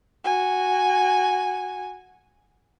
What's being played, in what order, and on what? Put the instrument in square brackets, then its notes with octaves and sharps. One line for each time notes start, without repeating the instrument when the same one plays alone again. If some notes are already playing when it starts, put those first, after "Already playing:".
[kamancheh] F#4 G#5